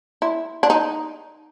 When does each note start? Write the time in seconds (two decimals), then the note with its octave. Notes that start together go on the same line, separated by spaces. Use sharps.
0.22 E4
0.63 D4
0.70 D#4